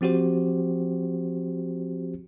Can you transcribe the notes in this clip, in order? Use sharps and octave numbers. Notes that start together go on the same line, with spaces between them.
F3 C4 F#4 G4 C5